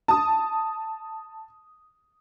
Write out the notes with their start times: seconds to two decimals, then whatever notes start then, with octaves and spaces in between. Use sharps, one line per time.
0.08 A5 D#6